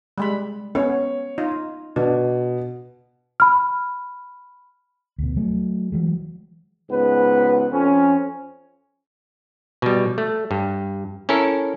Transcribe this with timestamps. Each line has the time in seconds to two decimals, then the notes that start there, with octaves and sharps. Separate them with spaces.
0.18 G3 G#3 B5
0.75 B3 C#4 C#5
1.38 D#4 F4 D#5
1.96 B2 D4
3.40 B5 F6
5.18 D2 B2
5.36 F#3 A3
5.92 E3 F#3 G#3
6.90 C#2 G#2 B3 B4
7.72 F2 C#4
9.82 B2 G3
10.18 A3
10.51 G2
11.29 C#4 E4 A4 A#4